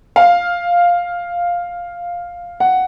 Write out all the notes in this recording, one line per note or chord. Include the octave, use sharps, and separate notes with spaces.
F5
F#5